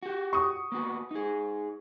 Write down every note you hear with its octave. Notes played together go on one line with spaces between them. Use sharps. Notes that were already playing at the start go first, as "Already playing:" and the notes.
F#4 G4
C#6 D#6
A#3 B3 F#4
D#4 G#4